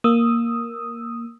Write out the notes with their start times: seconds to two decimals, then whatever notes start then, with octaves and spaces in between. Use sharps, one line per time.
0.04 A#3 D#6 E6